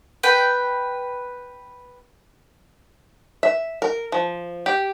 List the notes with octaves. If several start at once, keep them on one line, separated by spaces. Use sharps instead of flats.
B4 G5
E5
A#4
F3
G4